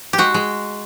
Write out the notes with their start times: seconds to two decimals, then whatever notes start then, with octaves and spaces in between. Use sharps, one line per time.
0.13 G4
0.18 G#3 F#4
0.34 G#3